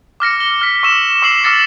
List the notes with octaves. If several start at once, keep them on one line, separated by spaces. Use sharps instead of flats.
D6 F6 A#6 C#7
G7
F6 B6
C#6 E6 E7
C#6 D6 E6 C7 E7 F#7
D6 E6 F6 A6 A#6 C#7